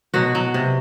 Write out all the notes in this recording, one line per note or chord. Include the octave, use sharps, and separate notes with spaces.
B2 F#3 F#4
F#3
C3